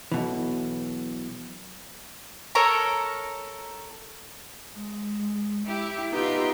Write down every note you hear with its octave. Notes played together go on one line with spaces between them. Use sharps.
B1 B2 E3
A4 A#4 C#5 A#5
G#3
E4 G4 E5
B3 D#4 F4 G4 E5 A#5 C6